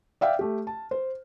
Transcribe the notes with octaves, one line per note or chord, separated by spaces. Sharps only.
D5 E5 F5 G5
A3 G4
A5
C5